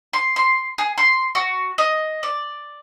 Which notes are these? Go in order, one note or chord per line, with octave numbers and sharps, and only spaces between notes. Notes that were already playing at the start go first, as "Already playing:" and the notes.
C6
C6
G#4
C6
F#4
D#5
D5